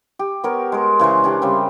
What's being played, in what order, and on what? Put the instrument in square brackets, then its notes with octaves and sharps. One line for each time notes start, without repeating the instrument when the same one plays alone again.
[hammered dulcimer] G4
B3 A#4 C#5
G#3 A#4
C#3 E3 C5 C#6
C#4 D4 G4
C#3 G3 C4